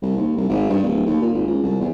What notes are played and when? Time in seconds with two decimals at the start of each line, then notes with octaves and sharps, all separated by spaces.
0.02 C2
0.17 D#2
0.37 C2
0.49 G#1
0.70 G2
0.83 D1
1.06 D#2
1.21 A#2
1.33 G#1
1.47 C#2
1.63 C2
1.80 E2